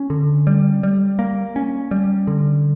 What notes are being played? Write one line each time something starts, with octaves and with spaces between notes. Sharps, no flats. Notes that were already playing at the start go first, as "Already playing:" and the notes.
Already playing: C#4
D3
G3
G3
A#3
C#4
G3
D3